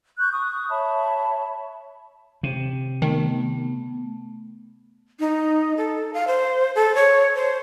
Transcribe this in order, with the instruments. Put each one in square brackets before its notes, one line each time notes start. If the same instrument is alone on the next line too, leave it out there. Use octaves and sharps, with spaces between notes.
[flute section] C#6 F#6 G6
C#6 D#6
C#5 E5 A5 B5
[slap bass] C3
[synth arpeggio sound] D#3 [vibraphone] A3 B3
[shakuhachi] D#4
A4
F5
C5
A4
C#5
C5